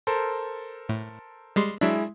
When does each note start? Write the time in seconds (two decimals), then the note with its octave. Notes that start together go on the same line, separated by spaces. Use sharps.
0.07 A4 A#4 C5
0.89 A2
1.56 G3 G#3 C6
1.81 F#3 G#3 D4 E4 E5